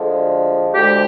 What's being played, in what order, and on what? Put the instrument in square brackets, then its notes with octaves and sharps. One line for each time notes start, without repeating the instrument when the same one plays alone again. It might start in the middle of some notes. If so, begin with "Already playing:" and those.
Already playing: [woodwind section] D2 D3 F3 G#3
D2 D3 F3 G#3 G4